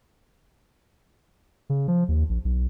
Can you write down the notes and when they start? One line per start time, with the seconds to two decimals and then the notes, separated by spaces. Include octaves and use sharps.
1.70 C#3
1.88 F3
2.08 D#2
2.29 A#1
2.45 B1